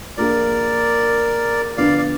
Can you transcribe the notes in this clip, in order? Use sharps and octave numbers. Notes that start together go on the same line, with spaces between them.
F3 A#3 D4 F4 G#4 A#4 D5
D3 F3 B3 D4 D5 F5
D5